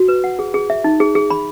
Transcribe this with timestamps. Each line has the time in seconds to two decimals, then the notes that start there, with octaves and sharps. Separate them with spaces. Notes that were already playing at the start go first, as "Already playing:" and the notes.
Already playing: F#4
0.08 B4
0.24 F#5
0.39 G#4
0.54 G#4
0.70 E5
0.84 D#4
1.00 G#4
1.15 G#4
1.30 B5